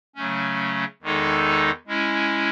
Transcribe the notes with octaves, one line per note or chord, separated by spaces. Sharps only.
C#3 F#3 A3 C#4
E2 D#3 G#3 D#4 A4
G#3 C#4 E4